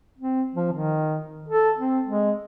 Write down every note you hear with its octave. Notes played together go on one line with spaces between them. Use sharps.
C4
F3
D#3
A4
C4
G#3